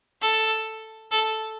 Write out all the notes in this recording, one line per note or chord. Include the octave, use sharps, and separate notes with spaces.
A4
A4